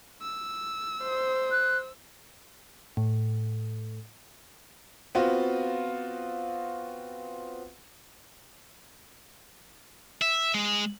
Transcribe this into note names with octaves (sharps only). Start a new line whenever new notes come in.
E6
C5
F#6
A2
B3 C4 F4 F#4
E5
G#3